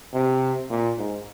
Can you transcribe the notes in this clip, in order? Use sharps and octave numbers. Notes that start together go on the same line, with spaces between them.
C3
A#2
G#2